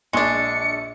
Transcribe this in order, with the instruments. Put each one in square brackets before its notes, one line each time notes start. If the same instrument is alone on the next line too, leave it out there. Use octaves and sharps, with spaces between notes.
[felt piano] A#1 C#6 [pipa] G#3 D4 [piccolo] C#7